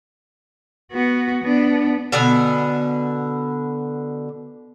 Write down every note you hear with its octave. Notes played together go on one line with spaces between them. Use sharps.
B3 F#4
B3 D4
B2 D3 B3 G#5